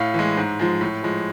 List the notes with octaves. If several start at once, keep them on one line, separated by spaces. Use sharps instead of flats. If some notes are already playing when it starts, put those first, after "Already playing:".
Already playing: A2 F5
E3 G#3
G#2
F3 G#3
A2
F3 G#3